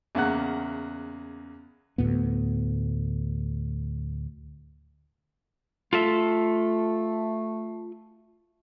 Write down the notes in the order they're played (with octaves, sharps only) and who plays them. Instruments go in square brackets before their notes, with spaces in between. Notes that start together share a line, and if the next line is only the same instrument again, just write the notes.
[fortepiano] E2 C#3 A#3 F#5 F#6
[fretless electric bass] D2 A2 B3
[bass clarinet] A3 [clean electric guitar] F4 A4 E5